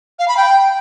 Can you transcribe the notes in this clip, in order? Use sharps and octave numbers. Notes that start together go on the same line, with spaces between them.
F5
B5
G5